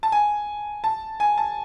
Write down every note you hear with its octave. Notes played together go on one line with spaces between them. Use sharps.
A5
G#5
A5
G#5
A5